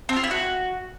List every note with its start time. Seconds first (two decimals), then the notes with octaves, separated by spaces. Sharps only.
0.09 C4
0.16 F4
0.24 E4
0.31 F#4